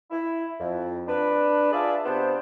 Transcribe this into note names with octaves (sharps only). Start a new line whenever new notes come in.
E4
F2
D4 B4
F4 G#4 D5 E5 A5
C3 B3 D4 C5